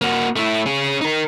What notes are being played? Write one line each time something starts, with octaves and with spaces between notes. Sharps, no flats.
A#3 F#4
A3 E4
C#4 G#4
D#4 A#4